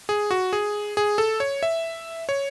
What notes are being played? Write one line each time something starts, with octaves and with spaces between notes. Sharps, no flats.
G#4
F#4
G#4
G#4
A4
C#5
E5
C#5